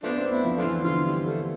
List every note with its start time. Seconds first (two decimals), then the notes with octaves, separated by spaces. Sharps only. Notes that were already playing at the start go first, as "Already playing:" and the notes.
0.04 F3 A3 B3 D4
0.18 C4
0.24 B3
0.31 E4
0.45 F3
0.57 A3 D4 F4
0.64 E3
0.84 D3 F4
1.05 G3
1.26 A3